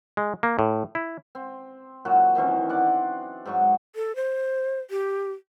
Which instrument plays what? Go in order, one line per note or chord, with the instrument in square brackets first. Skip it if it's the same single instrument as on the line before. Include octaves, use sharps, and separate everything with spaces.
[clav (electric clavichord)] G#3
A#3
A2
E4
[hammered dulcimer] C4
A#2 F#3 F#4
D#3 E3 C4 C#4
D4 F#5 D6
G#2 F#3 C#6
[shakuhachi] A4
C5
G4